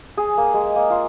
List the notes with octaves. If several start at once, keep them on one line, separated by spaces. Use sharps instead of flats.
G#4
A#3
G#3
A#3
F4